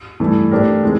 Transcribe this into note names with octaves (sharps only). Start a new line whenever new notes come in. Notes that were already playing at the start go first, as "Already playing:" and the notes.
G2 E3 A3
A3 D4 G4 A#4
E3 G#3 C4